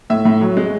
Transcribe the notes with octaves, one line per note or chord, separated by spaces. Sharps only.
A2 E5
A2
F#3
G#3